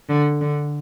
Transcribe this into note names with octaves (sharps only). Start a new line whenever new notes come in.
D3
D3